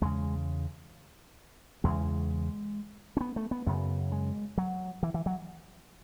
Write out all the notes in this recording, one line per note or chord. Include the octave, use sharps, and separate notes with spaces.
E2 C#3 G#3
E2 C#3 G#3
C#4
B3
A3
B3
F#2 C#3 B3
G#3
F#3
E3
E3
F#3